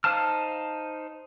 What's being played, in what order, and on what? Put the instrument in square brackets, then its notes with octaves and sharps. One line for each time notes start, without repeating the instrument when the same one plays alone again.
[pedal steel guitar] D#4 C5 F5 A5 F6